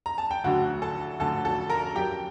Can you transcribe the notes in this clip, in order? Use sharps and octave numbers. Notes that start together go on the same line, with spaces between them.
A#5
A5
G5
D2 D3 F#3 F#4 F#5
A4 A5
D2 D3 F#3 A4 A5
A4 A5
A#4 A#5
F#2 F#3 G4 G5